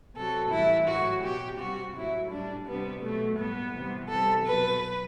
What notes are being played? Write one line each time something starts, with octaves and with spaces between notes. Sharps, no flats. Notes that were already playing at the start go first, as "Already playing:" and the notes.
C3 F#3 A4
A2 E3 G3 E4
A2 F#3 F#4
B2 F#3 G4
C3 G3 F#4
A2 F#3 E4
A2 G3 D4
C3 G3 B3
B2 F#3 A3
A2 G3 B3
C3 E3 G3
C3 E3 G3 A4
B2 F#3 B4